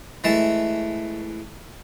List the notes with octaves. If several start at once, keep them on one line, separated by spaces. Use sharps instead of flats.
E3 G#3 A3 A5